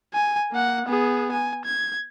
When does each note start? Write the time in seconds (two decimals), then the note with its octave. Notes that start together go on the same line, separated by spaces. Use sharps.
0.14 G#5
0.52 A#3 F#5
0.86 B3 G#4
1.32 G#5
1.65 G#6